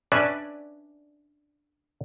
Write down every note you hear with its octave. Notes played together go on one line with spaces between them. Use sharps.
C#4 D4 B4 D5 E5 G#5